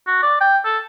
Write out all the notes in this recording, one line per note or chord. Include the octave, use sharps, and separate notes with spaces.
F#4
D5
G5
A4